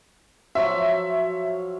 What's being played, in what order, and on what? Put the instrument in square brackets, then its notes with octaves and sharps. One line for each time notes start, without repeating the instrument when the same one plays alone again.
[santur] F3 F#3 C#5 [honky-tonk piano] E5